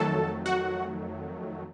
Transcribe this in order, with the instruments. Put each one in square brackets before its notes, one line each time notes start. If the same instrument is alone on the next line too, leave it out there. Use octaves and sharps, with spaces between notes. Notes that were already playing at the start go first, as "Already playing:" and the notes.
Already playing: [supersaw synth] F2 D#3 F#3 A3 A4 A5
F#4 F#5